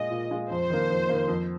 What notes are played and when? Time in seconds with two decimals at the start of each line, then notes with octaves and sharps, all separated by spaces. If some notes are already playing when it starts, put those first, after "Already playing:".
Already playing: A#2 G#3 F4 D#5
0.11 A#2
0.31 G#3 F4
0.50 F2 C5
0.70 D#3 A#3
0.90 F2
1.09 D#3 A#3
1.28 F2